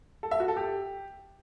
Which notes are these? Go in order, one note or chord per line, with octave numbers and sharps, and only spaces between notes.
A4
E5
F#4
A4
G4